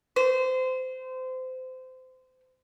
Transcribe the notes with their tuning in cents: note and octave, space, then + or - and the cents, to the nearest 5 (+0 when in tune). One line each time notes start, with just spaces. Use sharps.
C5 -25